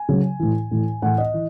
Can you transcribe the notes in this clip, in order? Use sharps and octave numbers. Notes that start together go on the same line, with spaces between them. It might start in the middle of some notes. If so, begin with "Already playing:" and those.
Already playing: G#5
C#3 F#3
A2 E3
A2 E3
A2 E3 F#5
D#5
E3